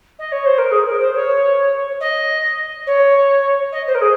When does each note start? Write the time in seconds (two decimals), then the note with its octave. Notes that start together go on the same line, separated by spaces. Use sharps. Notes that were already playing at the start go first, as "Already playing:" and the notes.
0.19 D#5
0.32 C#5
0.45 C5
0.58 A#4
0.71 G#4
0.86 A#4
1.00 C5
1.15 C#5
2.00 D#5
2.86 C#5
3.72 D#5
3.87 C5
3.94 A#4
4.01 G#4